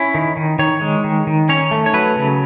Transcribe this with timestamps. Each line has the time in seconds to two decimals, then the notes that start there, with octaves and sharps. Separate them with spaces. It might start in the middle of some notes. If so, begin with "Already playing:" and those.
Already playing: C#4 E4
0.14 D#3
0.37 D#3
0.59 D#3 C#5
0.81 G#3
1.04 D#3
1.27 D#3
1.49 C#4 C#5
1.71 A3
1.86 C#5
1.94 F#3 B4
2.16 C#3